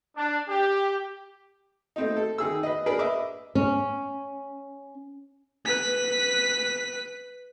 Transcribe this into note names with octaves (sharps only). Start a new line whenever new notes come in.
D4
G4
A3 C4 D#4
A4
D#3 G#4 E6
B4 D#5
D4 G#4 A#4 B4
D#5 E5 D6
C#4
B4 B6